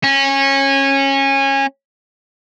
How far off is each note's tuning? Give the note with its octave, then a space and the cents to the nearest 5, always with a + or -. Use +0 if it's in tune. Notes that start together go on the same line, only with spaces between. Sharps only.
C#4 -20